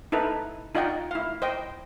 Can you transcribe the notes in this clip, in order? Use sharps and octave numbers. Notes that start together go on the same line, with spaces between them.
D#4 E4 A4 B4
D#4 F4 D5 D#5 F#5 G5
E4 F5
C5 D#5 G5